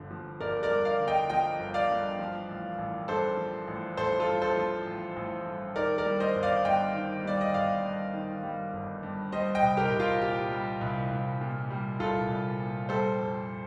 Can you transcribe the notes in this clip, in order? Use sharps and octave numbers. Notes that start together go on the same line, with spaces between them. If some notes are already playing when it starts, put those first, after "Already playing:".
Already playing: G1 G2 D3 F3
F3
G1 A#4 D5
A#4 D5
G2
D5 F5
D3
D#5 G5
F3 D#5 G5
G1
D5 F5
G2
F3
A1
A1
G2 A4 C5
F3
A1
A1 A4 C5
F4 A4
G2
A4 C5
F3
A1
A1
G2
D#3 A#4 D5
A#4 D5
G3
C5 D#5
G1
D5 F5
G2 D#5 G5
D#3
G3 D5
D#5
G1 D5 F5
G2
D#3
G3
G1
G2
G3 C5 D#5
D#5 G5
C2
G4 A#4
C2
F4
A#2 G4
G3
C2
C2
A#2
G3
C2 F4 A4
C2
A#2
G3 A4 C5
F2